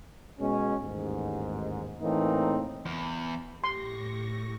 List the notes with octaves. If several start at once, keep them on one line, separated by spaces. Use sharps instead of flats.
B2 G#3 C#4
A1 D#2 G#2
A2 E3 A#3 C4 D#4
E2
A2 G4 C6 C#6 A#6